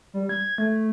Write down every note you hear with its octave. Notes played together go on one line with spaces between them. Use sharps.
G3
G#6
A3